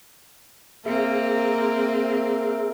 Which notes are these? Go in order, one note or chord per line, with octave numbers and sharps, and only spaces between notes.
A#3 C4 G#4 E5